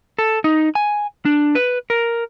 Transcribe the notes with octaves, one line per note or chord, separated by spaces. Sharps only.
A4
D#4
G#5
D4
B4
A#4